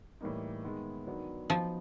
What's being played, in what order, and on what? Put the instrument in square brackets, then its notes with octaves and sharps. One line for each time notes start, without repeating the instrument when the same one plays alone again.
[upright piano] A2 E3 G3 A#3 D#4
D#3 G#3 B3
D#3 F#3 B3 D4
[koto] F3 [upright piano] F#3 B3 D#4